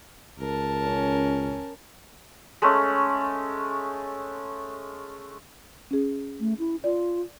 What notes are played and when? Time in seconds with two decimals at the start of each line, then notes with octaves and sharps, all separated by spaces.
0.39 C#2 A#4 A5
0.85 C#4
2.62 G#3 A3 C#4
5.91 C#4 G#4
6.40 A3
6.59 E4
6.84 F4 D5